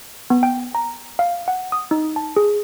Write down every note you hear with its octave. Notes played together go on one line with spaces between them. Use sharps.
B3
G5
A#5
F5
F#5
D#6
D#4
A5
G#4